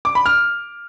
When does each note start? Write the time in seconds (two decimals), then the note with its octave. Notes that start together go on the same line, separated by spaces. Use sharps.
0.05 D6
0.15 B5
0.26 F6